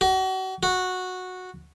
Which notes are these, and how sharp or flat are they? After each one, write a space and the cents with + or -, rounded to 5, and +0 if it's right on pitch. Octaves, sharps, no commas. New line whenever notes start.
F#4 +35
F#4 -10